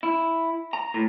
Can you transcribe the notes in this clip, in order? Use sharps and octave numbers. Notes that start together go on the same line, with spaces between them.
E4
A#5
A2